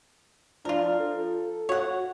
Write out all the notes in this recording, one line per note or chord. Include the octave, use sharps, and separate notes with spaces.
F3 D4 F4 A#4
A4
F#4 C#5 F#5